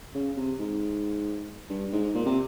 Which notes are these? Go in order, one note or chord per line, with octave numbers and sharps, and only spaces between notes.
C#3
C3
G#2
G2
G#2
A#2
C3